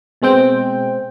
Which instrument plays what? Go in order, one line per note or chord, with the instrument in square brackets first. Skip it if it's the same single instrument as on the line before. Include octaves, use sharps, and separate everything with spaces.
[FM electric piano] B2 G#3 C4 G5